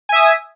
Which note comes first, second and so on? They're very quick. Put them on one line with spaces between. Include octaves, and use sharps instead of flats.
G#5 E5 D#6